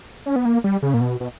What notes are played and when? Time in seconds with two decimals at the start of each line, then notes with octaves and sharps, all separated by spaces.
0.26 C#4
0.36 B3
0.45 A#3
0.64 G3
0.82 C#3
0.94 A#2
1.01 B2
1.20 B2